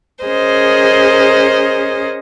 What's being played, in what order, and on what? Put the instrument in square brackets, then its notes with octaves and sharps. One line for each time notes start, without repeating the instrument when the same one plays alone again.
[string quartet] C#4 G#4 A#4 C5 D#5